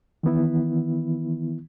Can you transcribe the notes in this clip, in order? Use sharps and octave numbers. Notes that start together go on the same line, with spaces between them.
D#3 E3 B3 E4